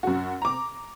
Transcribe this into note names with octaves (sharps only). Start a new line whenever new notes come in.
F#2 F#4
A#5 D6